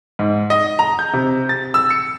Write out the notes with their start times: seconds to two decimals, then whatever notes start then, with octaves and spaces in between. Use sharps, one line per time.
0.19 G#2
0.50 D#5
0.79 A#5
0.99 G6
1.13 C3
1.49 A6
1.74 E6
1.90 C#7